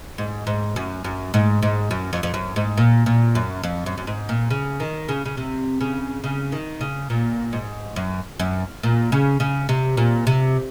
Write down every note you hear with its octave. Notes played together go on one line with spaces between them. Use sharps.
G#2
G#2
F#2
F#2
G#2
G#2
F#2
F2
F2
F#2
G#2
A#2
A#2
F#2
F2
F#2
F#2
G#2
A#2
C#3
D#3
C#3
C#3
C3
C#3
C#3
D#3
C#3
A#2
G#2
F#2
F#2
A#2
C#3
C#3
C3
A#2
C3